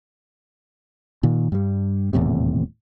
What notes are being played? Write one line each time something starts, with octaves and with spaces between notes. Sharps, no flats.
A#2 D#3
G2 G3
D#1 E2 A2 C3